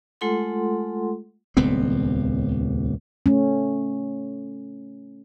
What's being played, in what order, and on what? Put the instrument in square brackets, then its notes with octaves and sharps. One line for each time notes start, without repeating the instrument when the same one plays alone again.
[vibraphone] G#3 A3 F4 A4 F#5 C6
[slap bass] D#1 C#2 B3 C4
[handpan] A3 C#4